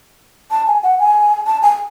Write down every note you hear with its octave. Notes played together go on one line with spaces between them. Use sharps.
A5
G#5
F#5
G#5
A5
G#5